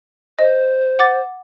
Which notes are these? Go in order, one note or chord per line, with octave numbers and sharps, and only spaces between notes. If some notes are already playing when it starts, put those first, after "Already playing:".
C5 D#5
F#5 D6 A6